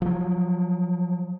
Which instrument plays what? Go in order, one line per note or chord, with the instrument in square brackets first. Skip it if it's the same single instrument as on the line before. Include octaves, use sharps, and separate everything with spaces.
[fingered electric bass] F3 F#3